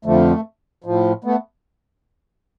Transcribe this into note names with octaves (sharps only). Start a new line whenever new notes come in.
F2 D3 F3 A3
A2 F3
A3 B3